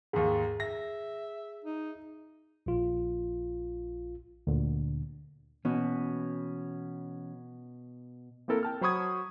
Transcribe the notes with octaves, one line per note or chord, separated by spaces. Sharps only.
D#2 G#2 G#4
E5 A#6
D#4
A#1 F4
D2 A#2 D3
B2 E3 C#4
A#3 C4 E4 A4 A#4
G5 A5 F6
F#3 C5 B5 C#6 D#6 G#6